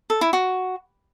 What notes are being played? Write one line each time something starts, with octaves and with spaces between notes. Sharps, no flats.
A4
E4
F#4